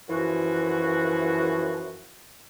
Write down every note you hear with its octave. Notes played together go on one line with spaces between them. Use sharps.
F#2 E3 F3 F#4